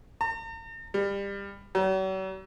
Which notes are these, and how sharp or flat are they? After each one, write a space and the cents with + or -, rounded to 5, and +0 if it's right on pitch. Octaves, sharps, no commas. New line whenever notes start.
A#5 -45
G3 +25
F#3 +45